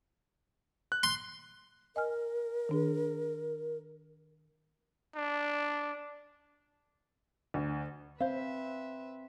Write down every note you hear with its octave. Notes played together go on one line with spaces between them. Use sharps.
F#6
C6
A#4 D#5 G#5 F6
D#3 D4 G#4
D4
D2
C4 B4 C5 E5 F5